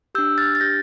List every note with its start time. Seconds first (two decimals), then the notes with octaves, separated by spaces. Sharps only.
0.15 D4 G4 E6 G6
0.38 F6 A6
0.55 A6
0.60 D4 G4 G6 A#6